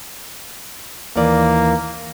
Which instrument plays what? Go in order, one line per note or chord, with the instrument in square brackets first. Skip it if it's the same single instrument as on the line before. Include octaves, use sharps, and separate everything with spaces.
[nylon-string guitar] D#2 E3 D5 [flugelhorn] A#3